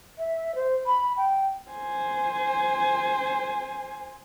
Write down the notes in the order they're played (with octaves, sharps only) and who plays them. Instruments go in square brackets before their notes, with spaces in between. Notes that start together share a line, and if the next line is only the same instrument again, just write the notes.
[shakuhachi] E5
C5
B5
G5
[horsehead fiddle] C5 G#5